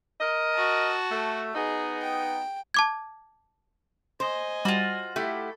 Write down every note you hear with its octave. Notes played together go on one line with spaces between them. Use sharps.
A#4 D#5
F#4 A5
A3
B3 D#4 G#4
G5
A5 D6 G#6
C5 D#5 G#5
G3 F4 F#4
A3 E4 G4 A4